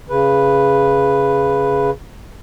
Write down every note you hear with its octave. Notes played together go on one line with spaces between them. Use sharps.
C#3 B4